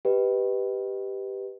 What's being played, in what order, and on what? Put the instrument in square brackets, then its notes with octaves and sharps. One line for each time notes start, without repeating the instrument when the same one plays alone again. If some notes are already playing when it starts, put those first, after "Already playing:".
[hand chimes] G4 B4 D#5